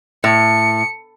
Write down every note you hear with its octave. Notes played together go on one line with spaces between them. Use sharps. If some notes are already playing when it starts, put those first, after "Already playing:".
A2 C#7